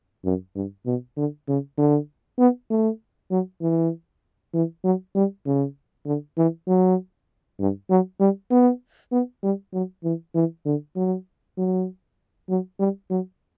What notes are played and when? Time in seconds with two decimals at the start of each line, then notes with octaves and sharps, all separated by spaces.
0.25 F#2
0.55 G2
0.86 B2
1.17 D3
1.48 C#3
1.78 D3
2.39 B3
2.70 A3
3.31 F#3
3.61 E3
4.54 E3
4.84 F#3
5.15 G3
5.46 C#3
6.06 D3
6.38 E3
6.67 F#3
7.60 G2
7.90 F#3
8.20 G3
8.51 B3
9.12 B3
9.43 G3
9.73 F#3
10.04 E3
10.35 E3
10.65 D3
10.96 F#3
11.58 F#3
12.49 F#3
12.79 G3
13.10 F#3